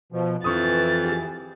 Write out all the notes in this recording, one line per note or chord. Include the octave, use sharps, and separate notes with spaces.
B2 F3
F2 E3 C#6 D#6 A6
G4 G#4